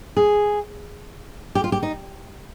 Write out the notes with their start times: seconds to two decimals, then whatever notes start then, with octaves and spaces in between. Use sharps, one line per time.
0.17 G#4
1.55 G4
1.64 F4
1.72 G4
1.83 D#4